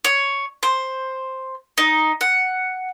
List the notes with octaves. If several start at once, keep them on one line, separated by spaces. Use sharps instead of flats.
C#5
C5
D#4
F#5